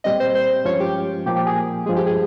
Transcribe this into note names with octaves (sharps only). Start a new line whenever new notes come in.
A#2 G3 C4 D#5
C5
C5
G2 F3 G#3 C#4 F4 C#5
G4
A#2 F3 A#3 G4
G4
G#4
G2 F3 G#3 G#4
G4
G#4